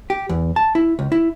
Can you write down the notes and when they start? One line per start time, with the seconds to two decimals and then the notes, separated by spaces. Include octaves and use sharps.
0.10 G4
0.29 E2
0.56 A5
0.75 E4
0.99 C#2
1.12 E4